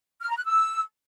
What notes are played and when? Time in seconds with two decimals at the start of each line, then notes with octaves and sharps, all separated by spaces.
0.21 F6
0.29 A#5
0.36 F#6
0.44 E6